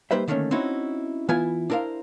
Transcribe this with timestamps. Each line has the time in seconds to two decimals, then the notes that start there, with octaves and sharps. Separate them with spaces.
0.11 G3 A#3 D#4 B4 C5 E5
0.28 D3 D#3 A3 A#3 C#4
0.51 C4 C#4 D#4 E4 F#4
1.29 E3 B3 E4 F4 G#5
1.70 D4 E4 A#4 C5 F5